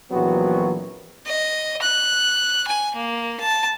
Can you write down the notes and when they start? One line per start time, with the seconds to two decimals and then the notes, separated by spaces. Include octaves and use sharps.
0.12 A#1 E3 F#3 B3 C4 F#4
1.26 D#5
1.82 F#6
2.67 G#5
2.95 A#3
3.40 A5